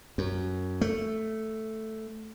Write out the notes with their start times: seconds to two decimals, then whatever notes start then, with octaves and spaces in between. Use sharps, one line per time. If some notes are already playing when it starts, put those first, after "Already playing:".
0.18 F#2
0.81 A3